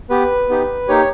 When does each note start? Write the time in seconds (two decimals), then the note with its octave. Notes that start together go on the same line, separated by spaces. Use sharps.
0.10 B3 G4 B4
0.49 B3 D#4 G4
0.88 A#3 D#4 G4 C#5